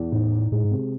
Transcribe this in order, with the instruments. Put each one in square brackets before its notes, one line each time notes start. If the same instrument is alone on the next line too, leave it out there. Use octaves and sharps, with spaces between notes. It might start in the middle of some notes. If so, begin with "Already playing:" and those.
Already playing: [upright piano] E2
[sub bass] A2 [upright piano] D#4
[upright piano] D#4
[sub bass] A2 [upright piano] G#3
[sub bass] G#2
[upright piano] C3